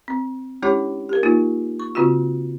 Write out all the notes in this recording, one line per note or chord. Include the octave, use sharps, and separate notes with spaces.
C4
G#3 C#4 D4 E4 G4 C#5
G4 A#4
A#3 D#4 F4
C#6
C#3 C4 F4 F#4